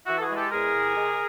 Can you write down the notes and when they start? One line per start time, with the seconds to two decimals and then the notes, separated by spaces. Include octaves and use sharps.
0.06 E3 E4 F#4
0.18 A4
0.22 F#4 G#4
0.30 G#3
0.36 G4 A4
0.52 E2 G#4 A#4
0.74 C3
0.97 G#3